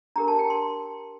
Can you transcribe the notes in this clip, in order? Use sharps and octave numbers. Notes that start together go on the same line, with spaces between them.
D4 G4 A#4 A#5
A5
G5
C6